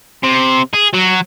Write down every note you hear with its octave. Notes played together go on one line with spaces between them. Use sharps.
C3
G#4
F#3